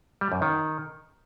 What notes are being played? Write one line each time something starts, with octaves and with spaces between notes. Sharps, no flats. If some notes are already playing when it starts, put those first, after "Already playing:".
G3
F#2
D#3